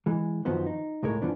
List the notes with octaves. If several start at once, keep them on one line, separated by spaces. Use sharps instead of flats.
E3 G#3
F#2 D#3 F3 B3 F#4 C5
D#4
C#2 A2 G#3 A#4 C#5
F#2 E3 F3 B3 D4